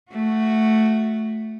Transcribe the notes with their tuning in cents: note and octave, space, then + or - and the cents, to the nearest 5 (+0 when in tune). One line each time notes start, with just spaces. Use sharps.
A3 +0 F#4 +0